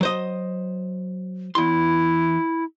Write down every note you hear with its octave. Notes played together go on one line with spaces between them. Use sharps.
F#3 C5 D#5
E2 E4 C6